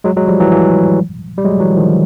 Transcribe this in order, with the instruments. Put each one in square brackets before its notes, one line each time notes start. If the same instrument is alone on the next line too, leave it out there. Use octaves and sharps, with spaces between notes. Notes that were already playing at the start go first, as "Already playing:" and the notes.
[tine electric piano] F#3 G#3
F#3 G#3
F3 G3
E3 F#3
E3 F#3
G3
F#3 G#3
E3 F#3
D#3 F3